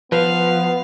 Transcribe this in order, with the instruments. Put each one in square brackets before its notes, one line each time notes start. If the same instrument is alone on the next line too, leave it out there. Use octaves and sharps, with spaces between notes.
[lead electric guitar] F3 [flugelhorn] B3 [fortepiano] B4 [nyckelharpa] F5